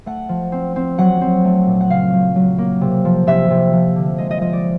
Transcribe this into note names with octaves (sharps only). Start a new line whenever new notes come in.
A3 F#5
F3
C4
C4
F#3 F#5
C4
A3
A#2
F#5
C#3 F5
F#3
F#3
A#3
C3
F3
C3 E5
C3
F3
D3
G#3 D#5
D#5
F3 D#5
D5